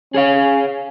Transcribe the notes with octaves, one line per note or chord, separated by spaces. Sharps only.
C#4 G#4 C#5 F5